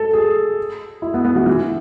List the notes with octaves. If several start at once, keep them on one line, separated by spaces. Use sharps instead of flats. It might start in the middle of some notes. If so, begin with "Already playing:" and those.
Already playing: A4
G#4
E4
B3
B3
E3
E3